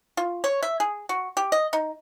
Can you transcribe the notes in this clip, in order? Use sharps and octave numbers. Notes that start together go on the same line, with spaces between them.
F4
C#5
E5
G#4
F#4
G4
D#5
D#4